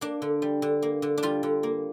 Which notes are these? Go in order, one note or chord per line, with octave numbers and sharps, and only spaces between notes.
A#3 D4
D3
G3
D3
A#3
D3
D4
G3 F4
D3
A#3